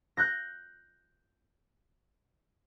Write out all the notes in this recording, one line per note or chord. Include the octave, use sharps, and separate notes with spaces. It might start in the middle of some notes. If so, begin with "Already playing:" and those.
F#6 G6 A#6